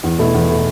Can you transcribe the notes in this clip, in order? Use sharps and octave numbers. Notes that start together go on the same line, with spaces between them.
E2
B2 A3 E4
E2
B2 A3 E4